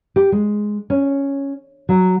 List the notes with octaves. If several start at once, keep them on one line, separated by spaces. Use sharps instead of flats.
G4
G#3
C#4
F#3